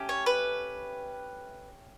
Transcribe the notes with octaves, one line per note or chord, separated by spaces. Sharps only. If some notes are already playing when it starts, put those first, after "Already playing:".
Already playing: A3 C#4 G4
C#5
B4